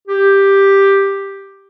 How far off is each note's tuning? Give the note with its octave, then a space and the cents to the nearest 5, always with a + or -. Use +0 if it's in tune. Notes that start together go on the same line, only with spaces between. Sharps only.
G4 +5